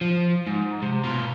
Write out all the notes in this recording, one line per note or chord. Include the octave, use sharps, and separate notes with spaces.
F3
G#2
C3
B2 F4